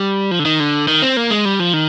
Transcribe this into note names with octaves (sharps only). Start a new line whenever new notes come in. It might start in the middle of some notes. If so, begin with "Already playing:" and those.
Already playing: G3
F3
D3
D#3
D3
D#3
C4
A#3
G#3
G3
F3
D#3